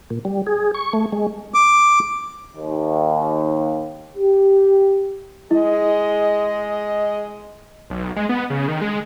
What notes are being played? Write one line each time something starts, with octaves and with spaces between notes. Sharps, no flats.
A#2
G3
G#4
C#6
A3
G#3
D6
D#2
G4
G#3 E4 G#4 D#5
B1
G#3
B3
C#3
D#3
G#3